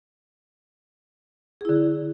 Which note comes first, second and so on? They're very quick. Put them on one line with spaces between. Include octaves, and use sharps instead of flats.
G#4 E4 D3